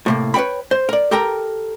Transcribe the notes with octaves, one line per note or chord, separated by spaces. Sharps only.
A2 C3 A#3
B4 C#5 F5 G5 B5
C5
A#4 D5
G4 A4 A#4 G5 A#5